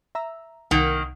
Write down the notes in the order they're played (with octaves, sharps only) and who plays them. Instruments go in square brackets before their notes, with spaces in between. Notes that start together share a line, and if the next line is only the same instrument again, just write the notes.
[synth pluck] E5 A#5 E6
[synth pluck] C2 F#5 [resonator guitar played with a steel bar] D#3 A#3